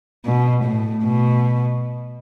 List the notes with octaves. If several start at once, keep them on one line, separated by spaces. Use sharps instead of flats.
B2
A2
B2